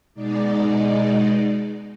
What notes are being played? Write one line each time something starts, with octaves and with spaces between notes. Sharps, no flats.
B2 G#3 D#4 D5